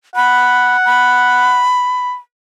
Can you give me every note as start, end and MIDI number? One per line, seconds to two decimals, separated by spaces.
0.16 1.66 78
0.16 0.77 83
0.85 2.11 83